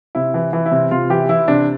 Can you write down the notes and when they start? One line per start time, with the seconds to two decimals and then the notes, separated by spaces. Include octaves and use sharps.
0.15 C3 E4
0.34 E3
0.53 E3
0.66 E4
0.71 C3
0.91 C3 F4
1.10 E3 G4
1.29 E3 E4
1.48 C3 D4